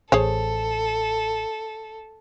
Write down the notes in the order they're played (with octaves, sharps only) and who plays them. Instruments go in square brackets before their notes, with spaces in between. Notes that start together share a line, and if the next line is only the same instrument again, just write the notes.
[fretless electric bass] A1 [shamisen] G#4 C5 C#5 [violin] A4